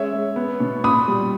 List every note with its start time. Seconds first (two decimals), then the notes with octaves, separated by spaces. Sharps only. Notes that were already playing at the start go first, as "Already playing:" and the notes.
Already playing: G#3 C#4 C#5 E5
0.13 G#3
0.36 B3
0.60 B2
0.84 A#2 B5 D#6
1.08 G3